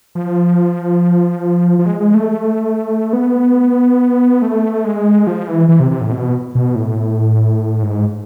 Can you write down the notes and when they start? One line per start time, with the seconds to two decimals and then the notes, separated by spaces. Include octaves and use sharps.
0.15 F3
1.79 F3
1.86 G#3
2.00 G#3
2.14 A3
3.13 B3
4.42 A3
4.85 G#3
5.27 F3
5.48 E3
5.69 E3
5.80 C3
5.91 C3
6.01 A2
6.12 B2
6.55 B2
6.75 A2
7.82 G#2